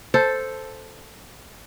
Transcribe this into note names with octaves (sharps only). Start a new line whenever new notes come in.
A4 C5